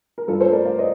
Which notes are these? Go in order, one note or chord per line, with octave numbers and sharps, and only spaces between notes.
A#4
G2 F4 A4
A4 C5
A3 A#4 D5
D5 F5
C5 D#5